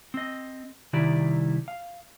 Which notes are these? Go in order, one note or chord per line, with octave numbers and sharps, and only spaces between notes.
C4 D#5
C2 D#3 G3 E4 D5
F5